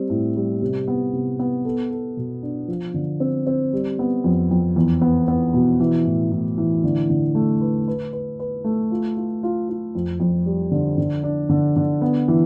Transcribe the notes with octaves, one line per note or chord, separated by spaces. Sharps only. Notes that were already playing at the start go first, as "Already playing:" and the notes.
Already playing: G3 C4
A2
G3
C3
B3
C3
B3
A4
A4
B2
D4
F3
D3
C4
C4
G3
B3
F2
F2
E2
B3
B3
B2
E3
A2
A2
E3
D3
D3
A3
B4
B4
B4
B4
A3
F4
F4
F4
F4
F2
F2
G3
D3
D3
D4
D3
D3
B3
E3